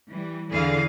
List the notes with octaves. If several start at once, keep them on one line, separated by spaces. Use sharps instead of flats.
E3 G3
E2 D3 E3 G#4 F5